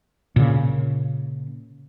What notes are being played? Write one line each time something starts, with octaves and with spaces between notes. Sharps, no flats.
A#2 C#3